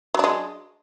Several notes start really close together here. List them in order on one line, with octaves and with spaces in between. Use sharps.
F#3 D4 G#3